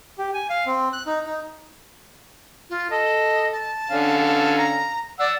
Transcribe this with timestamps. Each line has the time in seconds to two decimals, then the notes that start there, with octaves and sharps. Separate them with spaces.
0.18 G4
0.34 G#5
0.50 F5
0.66 C4
0.93 F#6
1.06 D#4
1.25 D#4
2.70 F4
2.90 A4 D#5
3.52 A5
3.90 D3 C#4 F5
4.57 A#5
5.19 D5 F#5 E6